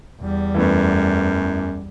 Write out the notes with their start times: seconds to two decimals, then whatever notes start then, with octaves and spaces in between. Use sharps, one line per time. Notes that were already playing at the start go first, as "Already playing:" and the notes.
0.21 E2 G3
0.54 F#2 E3 A3 B3